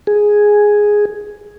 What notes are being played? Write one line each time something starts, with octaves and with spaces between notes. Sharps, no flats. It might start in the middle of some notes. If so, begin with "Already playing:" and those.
G#4